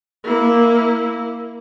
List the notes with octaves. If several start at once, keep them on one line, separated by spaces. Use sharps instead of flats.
A#3 E4